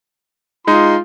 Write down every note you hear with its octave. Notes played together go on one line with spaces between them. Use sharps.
G#3 D#4 F4 C6